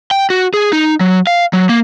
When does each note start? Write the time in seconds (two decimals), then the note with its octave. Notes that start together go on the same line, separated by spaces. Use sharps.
0.11 G5
0.30 F#4
0.54 G#4
0.73 D#4
1.00 F#3
1.27 F5
1.53 F#3
1.69 A#3